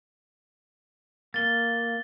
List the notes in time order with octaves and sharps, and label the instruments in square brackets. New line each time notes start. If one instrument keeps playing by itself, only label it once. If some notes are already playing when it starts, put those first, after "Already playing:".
[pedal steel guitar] A#3 [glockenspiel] A6 G7